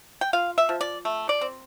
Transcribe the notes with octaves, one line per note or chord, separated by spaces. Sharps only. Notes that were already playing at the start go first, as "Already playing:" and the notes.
G5
F4 F5
E5
F3
D5
A3
D5
C4